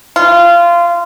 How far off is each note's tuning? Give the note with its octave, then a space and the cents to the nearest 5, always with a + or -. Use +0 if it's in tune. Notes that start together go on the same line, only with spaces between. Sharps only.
F4 -20